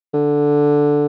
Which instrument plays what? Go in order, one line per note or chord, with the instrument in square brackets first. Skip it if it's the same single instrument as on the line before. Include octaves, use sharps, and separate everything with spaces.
[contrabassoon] D3